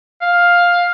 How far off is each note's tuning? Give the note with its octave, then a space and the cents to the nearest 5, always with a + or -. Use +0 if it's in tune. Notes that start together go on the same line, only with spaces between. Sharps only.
F5 +10